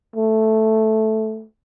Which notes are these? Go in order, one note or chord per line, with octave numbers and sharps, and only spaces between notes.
A3